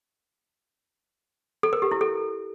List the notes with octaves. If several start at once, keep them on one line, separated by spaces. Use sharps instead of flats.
A4
A#4
G4
E4
A4